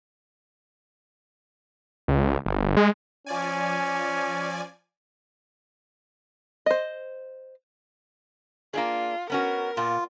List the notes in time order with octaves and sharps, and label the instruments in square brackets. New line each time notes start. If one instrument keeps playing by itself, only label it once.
[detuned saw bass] C#2
G1
G#3
[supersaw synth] F3 D5 G#5 [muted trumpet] C#4
[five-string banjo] C5 D#5
[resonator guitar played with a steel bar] A#3 D4 G#4 [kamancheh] F4
[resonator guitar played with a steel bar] B3 C#4 F#4 [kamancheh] A#4
[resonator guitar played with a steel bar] A#2 [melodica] F4